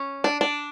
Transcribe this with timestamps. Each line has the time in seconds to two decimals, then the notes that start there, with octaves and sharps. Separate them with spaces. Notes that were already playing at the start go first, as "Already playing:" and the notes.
Already playing: C#4
0.24 D4
0.41 D4